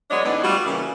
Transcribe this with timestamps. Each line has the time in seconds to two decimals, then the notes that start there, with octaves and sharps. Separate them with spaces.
0.11 F#3 G#3 B3 D4 C#5 D#5
0.25 A2 E3 B3 D4 D#4
0.44 G3 F4 F#4
0.65 C#3 E3 A#3